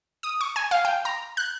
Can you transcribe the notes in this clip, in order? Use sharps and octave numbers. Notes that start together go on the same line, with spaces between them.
D#6
C#6
G#5
F5
G5
A#5
F#6